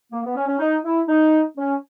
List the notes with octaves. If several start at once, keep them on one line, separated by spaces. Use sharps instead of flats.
A#3
B3
C#4
C#4
D#4
E4
D#4
C#4